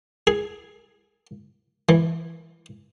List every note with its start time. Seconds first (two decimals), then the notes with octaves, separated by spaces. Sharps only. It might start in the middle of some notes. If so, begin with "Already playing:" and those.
0.27 G#4
1.89 E3